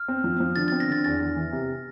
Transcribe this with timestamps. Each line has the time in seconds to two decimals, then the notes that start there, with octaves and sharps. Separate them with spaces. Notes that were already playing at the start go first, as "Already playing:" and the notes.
Already playing: F6
0.08 C4
0.24 F3
0.40 F3
0.56 D3 A6
0.68 C4 A6
0.80 A#6
0.89 D3 A6
1.04 E2 A6
1.21 E2
1.36 E3
1.52 C3